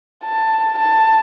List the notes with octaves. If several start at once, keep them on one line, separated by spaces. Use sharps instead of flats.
A5
A5